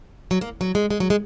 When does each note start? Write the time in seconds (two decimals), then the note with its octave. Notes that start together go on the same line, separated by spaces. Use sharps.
0.31 F#3
0.41 A#3
0.61 F#3
0.75 G#3
0.90 G#3
1.00 F#3
1.10 G#3